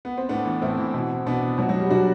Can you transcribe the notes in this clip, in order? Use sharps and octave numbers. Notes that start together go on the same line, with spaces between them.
B3
C4
A2 B3 D4
E3
A2 C4 E4
E3
B2
B2 B3 D4
B2 F#3
F#3
G3
B2 D4 F#4